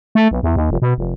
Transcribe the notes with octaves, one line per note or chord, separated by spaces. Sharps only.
A3
B1
E2
D#2
F1
B2
F1